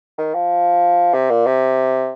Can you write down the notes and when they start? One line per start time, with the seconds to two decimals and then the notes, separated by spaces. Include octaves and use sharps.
0.18 D#3
0.34 F3
1.14 C3
1.30 A#2
1.46 C3